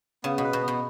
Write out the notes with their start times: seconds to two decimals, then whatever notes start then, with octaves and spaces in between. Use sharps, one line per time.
0.24 C#3 B3
0.38 B2
0.44 B4
0.53 B2
0.62 B3
0.68 B2